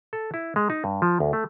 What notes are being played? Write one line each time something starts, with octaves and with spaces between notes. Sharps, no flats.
A4
E4
G#3
D#4
G2
F3
D2
A3